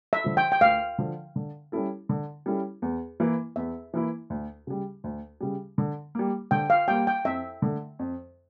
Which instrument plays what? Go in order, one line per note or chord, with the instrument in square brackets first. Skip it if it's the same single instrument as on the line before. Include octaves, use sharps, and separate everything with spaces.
[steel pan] E5
[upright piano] D3 F3
[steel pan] G5
G5
[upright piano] D2 [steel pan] F5
[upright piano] D3 F3
D3
G3 C#4 E4 A4
D3
G3 C#4 E4 A4
E2
E3 A#3 E4
[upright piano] E2 [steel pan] E5
[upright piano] E3 A#3 E4
D2
C#3 G3
D2
C#3 G3
D3
G3 A#3
[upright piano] D3 [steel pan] G5
[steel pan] F5
[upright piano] G3 A#3 [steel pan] G5
[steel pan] G5
[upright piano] F2 [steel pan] E5
[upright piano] D3 A3
F2